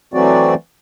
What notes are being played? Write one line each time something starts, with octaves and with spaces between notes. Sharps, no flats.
E3 F#3 A3 C4 F#4 D5